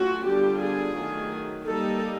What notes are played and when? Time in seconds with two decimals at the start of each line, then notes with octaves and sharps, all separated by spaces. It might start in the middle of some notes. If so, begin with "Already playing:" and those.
Already playing: F#3 A3 C#4 F4 F#4
0.25 D3 G3 B3 D4 F4 G4
0.61 G#4
0.96 D#3 F#3 A3
1.66 G3 A#3 D#4 A4